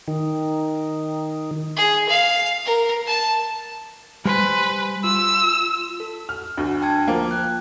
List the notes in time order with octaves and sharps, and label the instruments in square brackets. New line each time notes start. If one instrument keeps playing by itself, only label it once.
[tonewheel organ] D#3
[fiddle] G#4
F5
A#4
A5
[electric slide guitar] G3 C5 G#5 [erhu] B4
[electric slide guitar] F4 [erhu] E6
[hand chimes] A4
[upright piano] F6
[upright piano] D2 [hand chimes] D4
[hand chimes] G5 A5 G#6
[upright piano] F3 A#3
[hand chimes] F#6